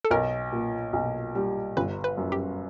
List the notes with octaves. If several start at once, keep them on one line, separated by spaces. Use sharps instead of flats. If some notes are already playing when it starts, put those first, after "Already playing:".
A4
B1 A#4
A#2
B1
G3
G1 B4
B4
F#2
G4